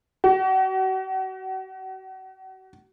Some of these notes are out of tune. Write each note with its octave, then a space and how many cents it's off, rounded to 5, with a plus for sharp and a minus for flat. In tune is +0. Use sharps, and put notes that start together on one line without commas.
F#4 +40